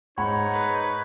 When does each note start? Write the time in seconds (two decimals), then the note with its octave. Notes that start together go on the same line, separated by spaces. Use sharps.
0.18 G#2 D#4 C#5 F#5 B5
0.53 B4